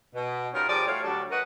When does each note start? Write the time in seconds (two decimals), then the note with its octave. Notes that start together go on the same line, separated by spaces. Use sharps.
0.15 B2
0.54 G3 C#4 D#4 F4 A#4
0.67 F3 G3 G4 G#4 A#4 D5
0.87 A3 F#4 C#5 F5
1.04 D2 F#3 G3 D4 F#4 A4
1.31 F#4 A#4 B4 D#5 F#5